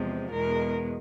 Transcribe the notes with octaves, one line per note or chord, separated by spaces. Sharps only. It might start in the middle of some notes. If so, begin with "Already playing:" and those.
Already playing: E2 C3 F3 G#3
E2 B2 G#3 A#4